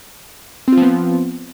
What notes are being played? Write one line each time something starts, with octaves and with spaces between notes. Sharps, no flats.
F3 B3 C4 F4